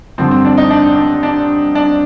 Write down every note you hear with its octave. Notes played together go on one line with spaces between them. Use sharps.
G2 D3 F3 C4
C4
D4
D#4
D4
D4
D4
D4